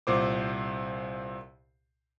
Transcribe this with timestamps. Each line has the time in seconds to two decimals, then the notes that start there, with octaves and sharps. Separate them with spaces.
0.07 C2 A#2 C5 D6